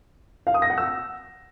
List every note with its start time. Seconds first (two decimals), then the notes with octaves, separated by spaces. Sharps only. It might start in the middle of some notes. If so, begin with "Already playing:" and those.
0.47 F5
0.54 D#6
0.62 A#6
0.70 F#5
0.78 E6